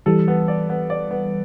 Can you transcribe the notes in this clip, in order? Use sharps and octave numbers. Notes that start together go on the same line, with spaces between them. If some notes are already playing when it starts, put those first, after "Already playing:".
E3 G3 A4
B3
D5
B3
D5
B3